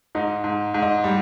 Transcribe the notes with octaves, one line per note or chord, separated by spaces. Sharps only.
G#2 D#4
G#2
G#2
D#5
G3